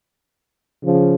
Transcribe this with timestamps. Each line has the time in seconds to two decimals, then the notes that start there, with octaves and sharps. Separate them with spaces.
0.83 C#3 F3